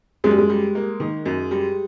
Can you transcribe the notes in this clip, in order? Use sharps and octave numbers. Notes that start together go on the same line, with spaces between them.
F#2 G#3
G3
G#3
G3
A#3
D#3
F#2
G3